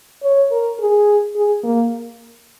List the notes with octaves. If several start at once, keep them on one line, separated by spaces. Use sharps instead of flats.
C#5
A#4
G#4
G#4
A#3